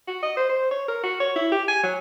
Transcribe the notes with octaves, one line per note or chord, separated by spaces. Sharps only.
F#4
D#5
C5
C5
C#5
A#4
F#4
C#5
E4
G4
G#5
F#3